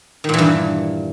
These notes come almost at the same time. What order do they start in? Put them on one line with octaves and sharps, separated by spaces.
D#3 A#2 E3 G2